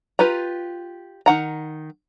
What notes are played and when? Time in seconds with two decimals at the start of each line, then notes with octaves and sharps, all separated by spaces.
0.19 F4 G4 B4 A#5
1.26 D#3 F#5 A#5